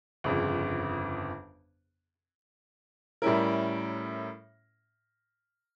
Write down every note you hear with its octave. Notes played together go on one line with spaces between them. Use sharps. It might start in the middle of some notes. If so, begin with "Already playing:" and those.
G1 F2 C#3
A2 G3 C#4 E4 A#4